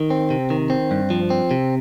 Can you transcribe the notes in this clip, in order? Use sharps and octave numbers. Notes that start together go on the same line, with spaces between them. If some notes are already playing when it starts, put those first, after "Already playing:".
Already playing: D#3
C4
C3
D#3
C4
G2
F3
C4
C3